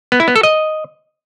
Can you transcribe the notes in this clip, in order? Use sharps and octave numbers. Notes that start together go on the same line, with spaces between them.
B3
E4
B3
A4
D#5